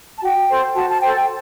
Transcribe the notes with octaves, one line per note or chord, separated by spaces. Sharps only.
A5
F#4 G5
A4 C5
F#4 A5
A5
A4 C5 G5
G5